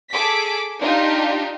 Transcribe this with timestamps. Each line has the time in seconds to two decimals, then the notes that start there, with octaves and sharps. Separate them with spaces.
0.11 G#4 A4 D6 B6
0.80 D4 D#4 F4 G4